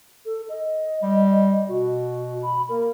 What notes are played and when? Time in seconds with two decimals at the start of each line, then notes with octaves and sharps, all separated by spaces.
0.26 A4
0.49 D#5
1.03 G3
1.69 B2 F#4
2.42 B5
2.69 A#3 A#4